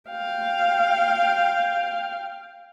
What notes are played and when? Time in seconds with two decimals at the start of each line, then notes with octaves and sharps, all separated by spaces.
0.10 F5 G5